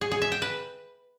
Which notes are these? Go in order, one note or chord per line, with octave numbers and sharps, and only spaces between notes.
G#4
G#4
E5
G5
B4